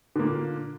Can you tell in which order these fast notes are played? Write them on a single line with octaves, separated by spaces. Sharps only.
D3 A#3 A#2